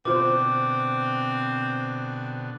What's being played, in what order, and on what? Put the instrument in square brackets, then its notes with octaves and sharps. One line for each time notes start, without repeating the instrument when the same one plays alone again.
[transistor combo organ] B2 D3 [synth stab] E3 F4 C5 [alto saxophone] C4 [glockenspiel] D6